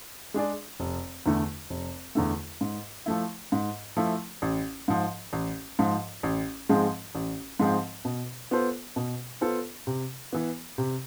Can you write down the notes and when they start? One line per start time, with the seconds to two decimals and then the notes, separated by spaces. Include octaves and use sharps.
0.34 G#3 D4 G#4 D5
0.80 F1
1.26 E2 D3 A3
1.70 F1
2.15 E2 D3 A3
2.61 G#2
3.06 F3 A3 E4
3.52 G#2
3.97 F3 A3 E4
4.42 A1
4.88 G#2 F3
5.33 A1
5.79 G#2 F3
6.23 A1
6.69 G#2 F3 G#3 C4
7.15 A1
7.60 G#2 F3 G#3 C4
8.05 B2
8.51 B3 F4 A4 C5
8.96 B2
9.41 B3 F4 A4 C5
9.87 C3
10.33 E3 B3
10.78 C3